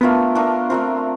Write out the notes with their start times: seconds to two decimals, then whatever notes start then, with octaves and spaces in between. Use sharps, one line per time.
0.01 A3 B3 D4 F4 A#4
0.35 A3 D4 F4 A#4
0.70 A3 C4 D4 F4 A#4